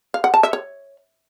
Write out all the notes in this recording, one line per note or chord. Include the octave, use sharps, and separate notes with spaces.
F5
F#5
A5
E5
C#5